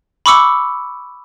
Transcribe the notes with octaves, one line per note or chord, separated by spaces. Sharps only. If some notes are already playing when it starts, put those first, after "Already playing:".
B5 C#6 D6 E6 C#7